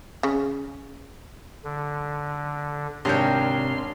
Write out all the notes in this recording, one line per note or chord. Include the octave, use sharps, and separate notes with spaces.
C#3
D3
G#1 C3 D4 A#4 C#5 G5 C6 F6